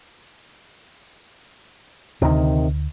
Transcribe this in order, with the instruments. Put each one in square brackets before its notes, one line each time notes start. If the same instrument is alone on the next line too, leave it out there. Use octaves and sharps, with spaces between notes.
[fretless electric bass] D2 [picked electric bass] C3 D#3